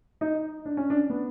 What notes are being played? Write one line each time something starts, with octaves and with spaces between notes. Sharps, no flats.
D#4
D4
C#4
D4
B3